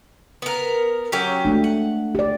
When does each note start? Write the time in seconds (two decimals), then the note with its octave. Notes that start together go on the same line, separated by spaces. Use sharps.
0.42 B3 A#4
1.12 F#3 C#4 G4
1.45 G#3 A3 D4
1.64 F#5
2.15 G4 D5